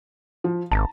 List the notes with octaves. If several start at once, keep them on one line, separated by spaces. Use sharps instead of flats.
F3
G#1 A5 A#5